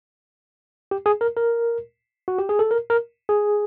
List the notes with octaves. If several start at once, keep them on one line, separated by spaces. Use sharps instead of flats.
G4
G#4
A#4
A#4
F#4
G4
G#4
A4
A#4
A#4
G#4